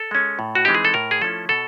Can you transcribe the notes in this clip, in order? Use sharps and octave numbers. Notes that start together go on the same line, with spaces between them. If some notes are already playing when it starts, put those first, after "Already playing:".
Already playing: A4
G#3 C#4
A2
F#4
E3 G#3 C4 D#4 G4
G#4
A4
A2 A#4
G#4
F3 A3 C#4 E4 A4
B2 A4